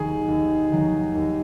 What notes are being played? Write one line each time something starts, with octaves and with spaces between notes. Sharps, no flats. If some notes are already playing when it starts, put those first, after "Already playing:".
Already playing: D#2 D#3 F#3 G#4
D#2
D#3 F#3
D#2